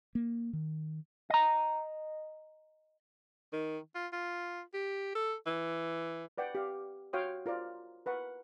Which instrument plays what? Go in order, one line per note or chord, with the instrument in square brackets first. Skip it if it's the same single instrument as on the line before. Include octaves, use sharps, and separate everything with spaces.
[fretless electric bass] A#3
D#3
[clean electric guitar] D#5 A#5
[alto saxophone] D#3
F4
F4
G4
A4
E3
[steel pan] B4 D5 F#5 G5
G4 F5
F#4 C#5 F5 G5 C6 D#6
F4 A#4 C5 D5
A#4 B4 F#5 C#6